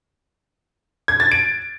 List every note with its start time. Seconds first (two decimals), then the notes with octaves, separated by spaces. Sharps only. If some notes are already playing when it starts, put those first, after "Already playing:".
1.08 G#6
1.20 A6
1.32 D7